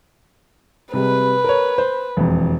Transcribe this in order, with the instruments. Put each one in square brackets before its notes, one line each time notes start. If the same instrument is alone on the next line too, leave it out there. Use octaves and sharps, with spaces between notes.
[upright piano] C3 G3 G#3 [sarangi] B4
[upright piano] A#4 C#5
C5
E1 F2